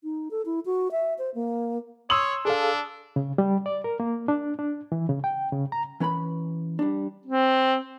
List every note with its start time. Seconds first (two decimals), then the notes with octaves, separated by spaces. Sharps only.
0.04 D#4
0.31 A4
0.46 E4
0.66 F#4
0.91 E5
1.19 C5
1.35 A#3
2.10 C#5 C6 D#6 E6 F#7
2.45 D4 G#4 A4 F5
3.16 C#3
3.38 G3
3.66 D5
3.84 A#4
4.00 A#3
4.28 D4
4.59 D4
4.92 E3
5.09 C#3
5.24 G5
5.52 C#3
5.72 A#5
6.00 E3 C#4 B4 A#5 B5
6.79 G3 D4
7.26 C4